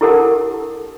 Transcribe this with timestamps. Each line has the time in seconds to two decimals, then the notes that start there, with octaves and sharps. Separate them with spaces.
0.01 E4 G4 A4 A#4 F#5 A5